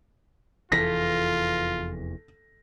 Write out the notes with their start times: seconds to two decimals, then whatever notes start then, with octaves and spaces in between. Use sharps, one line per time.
0.72 F1 E2 E3 F4 A4 A#6 B6